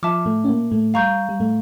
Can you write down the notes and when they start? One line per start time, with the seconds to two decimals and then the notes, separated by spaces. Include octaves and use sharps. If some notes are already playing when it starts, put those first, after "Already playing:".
0.03 F3 E5 A5 D6 F6
0.25 A2 A3
0.44 C#4
0.49 A#2 A#3
0.71 A2 A3
0.94 G3 F5 A#5 C#6 G6
1.29 G3
1.40 A2 A3